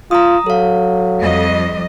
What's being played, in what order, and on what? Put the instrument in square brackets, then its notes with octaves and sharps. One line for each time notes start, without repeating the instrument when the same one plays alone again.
[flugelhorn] F4 [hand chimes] A#5 D#6
[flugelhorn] F#3 [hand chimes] A4 F5
[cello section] F2 G3 D#5